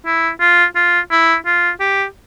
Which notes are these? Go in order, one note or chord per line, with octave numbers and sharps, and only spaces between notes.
E4
F4
F4
E4
F4
G4